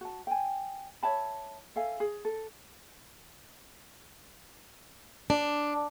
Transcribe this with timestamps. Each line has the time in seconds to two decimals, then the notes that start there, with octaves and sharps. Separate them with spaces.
0.01 F#4 A5
0.27 G5 G#5
1.03 C#5 E5 A5 B5
1.76 A4 E5 F5 G#5
2.00 G#4
2.25 A4
5.30 D4